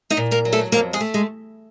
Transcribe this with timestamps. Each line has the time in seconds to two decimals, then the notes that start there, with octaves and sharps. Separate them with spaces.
0.10 D#4 D#5
0.17 A#2
0.31 A#3 A#4
0.45 F#3
0.52 A3 A4
0.72 F2 A#3 A#4
0.93 G#3 G#4
1.01 A3
1.14 G#3